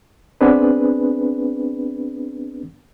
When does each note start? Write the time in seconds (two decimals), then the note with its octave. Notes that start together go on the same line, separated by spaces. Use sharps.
0.41 B3 C4 D4 G#4 B4